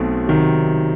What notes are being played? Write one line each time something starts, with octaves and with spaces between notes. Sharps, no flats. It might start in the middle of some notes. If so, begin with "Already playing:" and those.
Already playing: B1 B2 A3 C4
C3 D#3 F#3